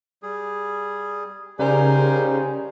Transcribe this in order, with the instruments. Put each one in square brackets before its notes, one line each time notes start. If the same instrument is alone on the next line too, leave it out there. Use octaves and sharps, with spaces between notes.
[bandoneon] G3 G#4
[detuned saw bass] C#3 [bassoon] G3 [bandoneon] D#4 [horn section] A#4 C5 G#5